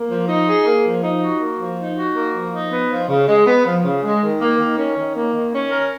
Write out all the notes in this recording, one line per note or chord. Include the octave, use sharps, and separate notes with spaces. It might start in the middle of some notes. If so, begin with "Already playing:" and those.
Already playing: A#3
F3
D#4
G#4
A#3
F3
D#4
F#4
A#3
F3
D#4
F#4
A#3
F3
D#4
B3
F3
C#3
G#3
B3
F3
C#3
G#3
D#3
A#3
D#3
C#4
D#3
A#3
D#3
C#4
A#4